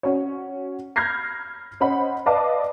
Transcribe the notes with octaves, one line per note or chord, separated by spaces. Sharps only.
C#4 F#4 C#5
B5 F6 G6 G#6 A#6 C7
C#4 C5 D#5 F#5 B5
B4 D5 D#5 F5 A5 D6